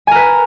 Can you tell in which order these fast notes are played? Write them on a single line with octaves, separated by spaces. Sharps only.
G#5 A#4 B4